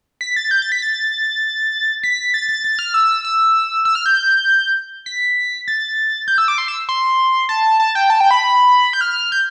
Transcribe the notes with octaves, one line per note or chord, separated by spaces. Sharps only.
B6
A6
G6
A6
B6
A6
B6
A6
A6
A6
F6
E6
E6
E6
F6
G6
B6
A6
G6
E6
D6
C6
E6
C6
A5
A5
G5
A5
G5
B5
G6
F6
G6